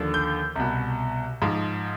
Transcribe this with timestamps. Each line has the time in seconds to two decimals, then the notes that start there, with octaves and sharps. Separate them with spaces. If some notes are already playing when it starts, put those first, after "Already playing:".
Already playing: D#2 D3 F3
0.14 G6
0.56 C2 B2
1.42 G#2 F3